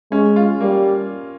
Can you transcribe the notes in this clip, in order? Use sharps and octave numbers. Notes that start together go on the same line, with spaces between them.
G#3 C#4
F4
G3 A#3